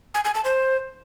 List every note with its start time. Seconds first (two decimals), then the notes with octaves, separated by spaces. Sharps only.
0.14 G#5
0.24 G#5
0.35 A5
0.45 C5